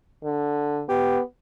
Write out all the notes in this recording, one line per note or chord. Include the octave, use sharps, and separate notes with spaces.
D3
B3 G4